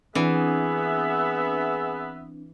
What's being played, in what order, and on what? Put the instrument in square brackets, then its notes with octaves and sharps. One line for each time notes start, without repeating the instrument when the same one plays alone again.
[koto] E3 [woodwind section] B3 E5 [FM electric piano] C4 D4 [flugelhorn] G#4